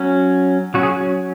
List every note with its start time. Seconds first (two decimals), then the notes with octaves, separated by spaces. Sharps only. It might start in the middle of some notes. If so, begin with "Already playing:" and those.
Already playing: F#3 C#4
0.74 F#3 C#4 F#4
0.83 G#4